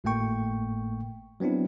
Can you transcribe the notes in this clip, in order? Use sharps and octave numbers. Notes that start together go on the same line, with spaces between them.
G#1 A2 A3 A#3 G5 C#6
F#3 B3 C4 D4 E4